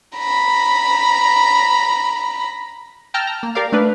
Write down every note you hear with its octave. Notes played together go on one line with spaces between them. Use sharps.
A#5 B5
G5 A5 A#5 E6 F6
A#5
A#3
G4 A#4 D5 F5
A3 D4 B4